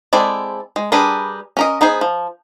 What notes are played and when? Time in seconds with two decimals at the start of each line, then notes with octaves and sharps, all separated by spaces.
0.13 G#3 C4 E4 A4 D5
0.76 G#3
0.92 G3 D4 G#4 A#4 B4
1.57 C#4 A#4 D#5
1.81 B3 D#4 G#4 C5
2.01 F3